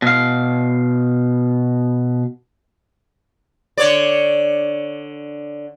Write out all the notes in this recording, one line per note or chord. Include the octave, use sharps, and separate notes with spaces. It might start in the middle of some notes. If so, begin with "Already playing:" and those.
B2 F5
D3 C#5 D5